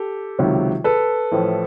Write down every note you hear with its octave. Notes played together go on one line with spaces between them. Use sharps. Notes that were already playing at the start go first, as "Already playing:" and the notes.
Already playing: G4 A4
C#2 C3 D#3 F#3
A4 B4
A1 A2 F3